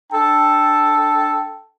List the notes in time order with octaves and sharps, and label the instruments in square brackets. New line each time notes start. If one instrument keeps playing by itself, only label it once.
[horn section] D4 A4 G5 A5